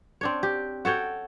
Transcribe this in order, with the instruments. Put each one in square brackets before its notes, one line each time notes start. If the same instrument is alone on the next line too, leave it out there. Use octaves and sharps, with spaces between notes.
[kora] C4 D4 C#5
G4
F#4 A4 C#5 G5